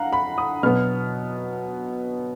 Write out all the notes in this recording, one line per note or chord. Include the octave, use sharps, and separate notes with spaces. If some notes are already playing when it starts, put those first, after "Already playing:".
Already playing: D3 F5 F#5 A#5
B5
D#6
B2 F#3 B3 F6